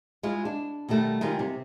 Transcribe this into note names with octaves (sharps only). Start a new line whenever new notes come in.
G#3 E4 F4
D4
B2 D#3 G3 A3
D#3 G3 G#3 F4
C3